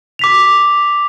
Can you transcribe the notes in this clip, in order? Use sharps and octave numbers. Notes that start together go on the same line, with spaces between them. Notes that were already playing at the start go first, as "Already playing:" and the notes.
D6 B6 F7